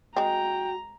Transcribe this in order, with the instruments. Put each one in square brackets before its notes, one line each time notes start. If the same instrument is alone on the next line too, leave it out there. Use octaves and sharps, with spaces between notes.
[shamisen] G#3 C4 [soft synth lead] F#4 [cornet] G5 [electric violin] A#5